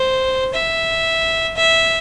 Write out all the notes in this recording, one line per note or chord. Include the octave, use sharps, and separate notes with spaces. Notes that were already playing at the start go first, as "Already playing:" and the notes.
Already playing: C5
E5
E5